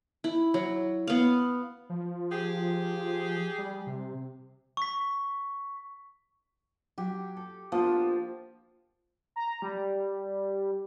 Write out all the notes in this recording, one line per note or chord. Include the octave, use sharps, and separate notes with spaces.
E4
F#3
B3 F5
F3
G4 G#4
G3
C3
C#6 B6
F#3 G4
A4
F3 A#3 B3 D4
A#5
G3